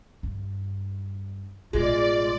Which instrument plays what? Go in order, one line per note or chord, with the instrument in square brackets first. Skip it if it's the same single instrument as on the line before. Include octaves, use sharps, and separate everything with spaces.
[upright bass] G2
[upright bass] A1 B2 [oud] G#3 [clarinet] F4 [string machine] D5